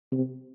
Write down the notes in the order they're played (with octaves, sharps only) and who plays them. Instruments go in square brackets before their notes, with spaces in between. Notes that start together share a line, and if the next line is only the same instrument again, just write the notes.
[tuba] C3